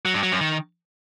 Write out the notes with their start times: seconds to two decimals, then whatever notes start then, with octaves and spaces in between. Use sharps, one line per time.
0.05 F#3
0.14 G2
0.23 F#3
0.32 F#2
0.41 D#3